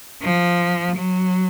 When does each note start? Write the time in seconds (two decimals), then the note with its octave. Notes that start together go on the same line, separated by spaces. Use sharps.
0.22 F3
0.96 F#3